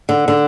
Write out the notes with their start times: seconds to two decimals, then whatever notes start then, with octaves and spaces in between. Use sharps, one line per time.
0.09 D3
0.28 D3